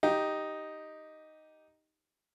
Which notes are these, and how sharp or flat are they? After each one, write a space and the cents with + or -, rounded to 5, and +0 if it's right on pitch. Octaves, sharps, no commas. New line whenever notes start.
D#4 +0 G4 +0